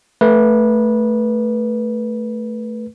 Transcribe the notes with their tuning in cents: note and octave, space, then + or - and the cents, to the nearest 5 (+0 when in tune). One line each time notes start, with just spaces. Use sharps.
A3 +0 B4 -20